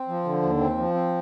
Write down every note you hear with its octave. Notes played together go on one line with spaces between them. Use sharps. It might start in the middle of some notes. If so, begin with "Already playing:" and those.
Already playing: C4
F3
D3
D#2
C4
F3
C4